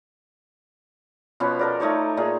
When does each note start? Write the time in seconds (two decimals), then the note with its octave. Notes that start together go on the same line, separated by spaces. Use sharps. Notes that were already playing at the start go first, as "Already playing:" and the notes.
1.40 B2 F3 B3 C#4
1.59 A4 A#4 D5
1.80 A3 D#4 C#5 D6
2.17 A#2 D#4 G#4